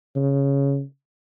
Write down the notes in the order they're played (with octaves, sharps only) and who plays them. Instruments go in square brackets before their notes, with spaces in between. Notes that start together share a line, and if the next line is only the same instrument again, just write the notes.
[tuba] C#3